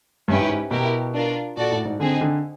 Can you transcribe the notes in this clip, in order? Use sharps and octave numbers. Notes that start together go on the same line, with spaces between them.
G2 C#4 E4 G4 B4
G#2
G#2
B2 E4 G4 A#4
D4 F4 A#4
A#2 F#4 A4 D5
A2
G#2
D3 C4 D#4 G#4
D3